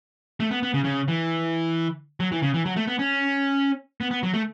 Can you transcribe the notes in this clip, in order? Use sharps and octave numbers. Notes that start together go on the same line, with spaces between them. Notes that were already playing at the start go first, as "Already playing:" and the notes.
A3
B3
B3
C#3
C#3
E3
F#3
E3
C#3
E3
F#3
A3
B3
C#4
B3
B3
F#3
A3